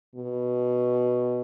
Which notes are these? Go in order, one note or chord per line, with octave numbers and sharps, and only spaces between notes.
B2